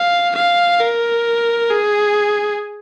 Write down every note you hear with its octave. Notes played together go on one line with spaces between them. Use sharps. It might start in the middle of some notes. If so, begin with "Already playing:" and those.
Already playing: F5
F5
A#4
G#4